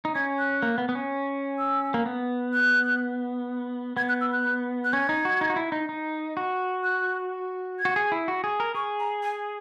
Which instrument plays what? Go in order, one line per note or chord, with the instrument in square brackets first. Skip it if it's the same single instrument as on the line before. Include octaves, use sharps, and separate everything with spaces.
[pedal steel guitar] D#4
[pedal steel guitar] C#4 [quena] G#6
[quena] F#6
[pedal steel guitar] A#3
B3
B3
C#4
[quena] E6
[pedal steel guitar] A#3
B3
[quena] F#6
[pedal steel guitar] B3 [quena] G#6
[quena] F#6
E6
F#6
F#6
[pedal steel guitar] C#4 [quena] G#6
[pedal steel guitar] D#4
F#4
D#4
F#4
E4
D#4
D#4
F#4
[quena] F#6
G#6
[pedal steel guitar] F#4
G#4
E4
F#4
G#4
A#4
[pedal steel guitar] G#4 [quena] C#6
[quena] A#5
G#5